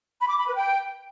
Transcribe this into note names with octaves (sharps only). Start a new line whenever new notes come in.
B5
D6
B5
B4
G5